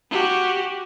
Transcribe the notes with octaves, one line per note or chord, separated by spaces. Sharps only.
F#4 G4